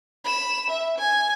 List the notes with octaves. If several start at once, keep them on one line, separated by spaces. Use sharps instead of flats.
B5 E7
E5
G#5